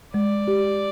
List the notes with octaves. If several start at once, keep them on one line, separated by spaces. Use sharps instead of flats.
G#3 D5
G4